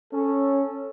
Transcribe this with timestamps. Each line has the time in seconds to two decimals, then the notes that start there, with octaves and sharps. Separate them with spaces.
0.13 C#4 A4